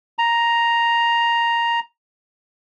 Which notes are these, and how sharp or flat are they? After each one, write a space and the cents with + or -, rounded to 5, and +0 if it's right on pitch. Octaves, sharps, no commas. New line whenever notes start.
A#5 +5